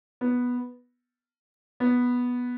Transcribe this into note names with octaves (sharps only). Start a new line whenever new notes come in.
B3
B3